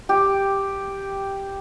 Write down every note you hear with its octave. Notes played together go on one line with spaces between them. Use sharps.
G4